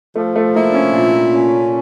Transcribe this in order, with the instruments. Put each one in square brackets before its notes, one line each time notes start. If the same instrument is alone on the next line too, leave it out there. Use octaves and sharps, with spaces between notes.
[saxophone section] F3 [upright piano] A3
[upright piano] A3
[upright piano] A#3 [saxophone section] E4
[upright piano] D4
C#4
[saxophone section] A#2 [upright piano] D4
[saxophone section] C#4